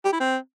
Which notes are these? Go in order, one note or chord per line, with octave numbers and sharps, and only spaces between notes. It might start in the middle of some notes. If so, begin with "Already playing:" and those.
G4
E4
C4